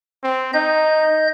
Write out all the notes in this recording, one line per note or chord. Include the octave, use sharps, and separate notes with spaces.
C4
D#4 D#5 G6